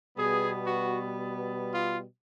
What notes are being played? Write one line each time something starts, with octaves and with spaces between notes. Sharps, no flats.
B2 G3 B3 G#4
F#4
F4